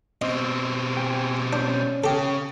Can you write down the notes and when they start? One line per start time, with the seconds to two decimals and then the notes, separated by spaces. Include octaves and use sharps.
0.22 B2 C4 D#5
0.97 G5 G#5
1.53 C#4 D4 G6
2.04 C#3 G4 A4